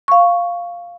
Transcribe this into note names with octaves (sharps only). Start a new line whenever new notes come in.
F5 C#6